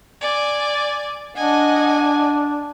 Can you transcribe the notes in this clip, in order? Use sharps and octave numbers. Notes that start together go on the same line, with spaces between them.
D5 G#5
D4 D#5 F#5 G#5